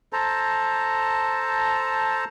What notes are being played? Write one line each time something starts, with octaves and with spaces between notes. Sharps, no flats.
A4 C5 A5 A#5